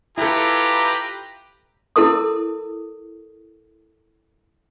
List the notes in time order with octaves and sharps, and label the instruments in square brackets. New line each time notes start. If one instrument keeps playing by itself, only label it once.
[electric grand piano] E4 A4 [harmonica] F4 B4 A#5 [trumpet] G4
[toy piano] E4 A4 A#4 D#6